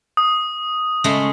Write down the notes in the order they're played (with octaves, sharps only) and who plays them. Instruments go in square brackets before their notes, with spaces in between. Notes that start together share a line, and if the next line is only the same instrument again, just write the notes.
[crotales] D#6
[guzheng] C#3 G#3 A3